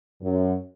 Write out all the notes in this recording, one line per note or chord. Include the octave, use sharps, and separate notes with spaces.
F#2